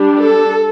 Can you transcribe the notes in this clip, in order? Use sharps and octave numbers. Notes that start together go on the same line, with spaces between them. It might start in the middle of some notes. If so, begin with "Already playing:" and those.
Already playing: G3 D4
A4